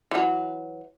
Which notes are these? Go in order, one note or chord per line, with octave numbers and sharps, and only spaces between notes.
E3 F#3